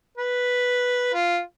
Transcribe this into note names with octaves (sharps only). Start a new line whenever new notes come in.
B4
F4